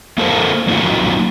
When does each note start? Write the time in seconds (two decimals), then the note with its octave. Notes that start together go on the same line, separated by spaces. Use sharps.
0.18 A#3 F4 A4 A#4 C5
0.67 F#3 A#3 D#4 F4 F#4